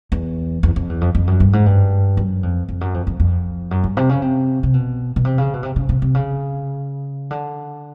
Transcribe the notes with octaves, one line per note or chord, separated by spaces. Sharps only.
E2
E2
F2
E2
F2
F2
F#2
G2
G#2
G2
F#2
F2
F2
F#2
F2
F2
F2
F#2
G2
C3
C#3
C3
C3
B2
B2
C3
C#3
B2
C3
C#3
C3
C3
C#3
D3